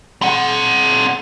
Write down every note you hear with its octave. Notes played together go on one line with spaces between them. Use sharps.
C4 F#5